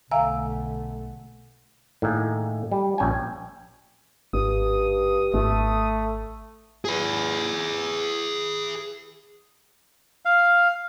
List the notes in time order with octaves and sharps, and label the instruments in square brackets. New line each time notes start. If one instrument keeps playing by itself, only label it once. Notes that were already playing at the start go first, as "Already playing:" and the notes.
[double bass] B1 A3 [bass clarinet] D3 [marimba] E5 F5 [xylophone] G#5 A#5 E6
[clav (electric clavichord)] A2 D#3 A#3 G#4
G3
A#1 C#4 G5 G#5
[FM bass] G#1 [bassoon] G2 [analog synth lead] D#6
[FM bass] G#1 [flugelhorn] A3
[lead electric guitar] G#4 B4
[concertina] F5